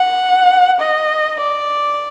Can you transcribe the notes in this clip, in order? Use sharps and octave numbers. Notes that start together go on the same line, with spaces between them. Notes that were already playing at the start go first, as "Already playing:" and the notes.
Already playing: F#5
D#5
D5